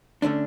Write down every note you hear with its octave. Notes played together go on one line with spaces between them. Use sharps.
D3 A3 C#4 D4